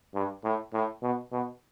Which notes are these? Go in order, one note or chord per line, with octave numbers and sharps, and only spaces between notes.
G2
A2
A2
B2
B2